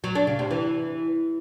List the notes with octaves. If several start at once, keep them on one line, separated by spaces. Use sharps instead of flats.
F#3
D4
C#3
C3
E3